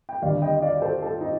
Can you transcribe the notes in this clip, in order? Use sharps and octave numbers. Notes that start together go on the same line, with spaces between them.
G5
D#2 D3 G3 D5 F5
D#5 G5
D#5
D5 F5
A4 C5
F4 A4
D#4